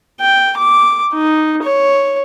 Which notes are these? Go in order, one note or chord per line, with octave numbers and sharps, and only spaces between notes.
G5
D6
D#4
C#5